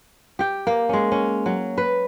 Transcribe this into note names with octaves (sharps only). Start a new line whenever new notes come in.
G4 G5
A#3
G#3 C#4
C#4
F#3
B4